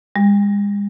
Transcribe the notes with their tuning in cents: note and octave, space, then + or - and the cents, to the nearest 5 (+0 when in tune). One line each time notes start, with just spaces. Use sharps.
G#3 -40